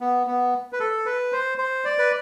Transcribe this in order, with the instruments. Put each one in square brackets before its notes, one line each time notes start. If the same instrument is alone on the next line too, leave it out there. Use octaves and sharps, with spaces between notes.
[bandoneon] B3
B3
B4
A4
B4
C5
C5
D5
B4